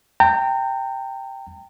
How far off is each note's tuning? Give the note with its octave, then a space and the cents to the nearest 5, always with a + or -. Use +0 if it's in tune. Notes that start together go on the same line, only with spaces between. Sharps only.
G5 +0 A#5 -35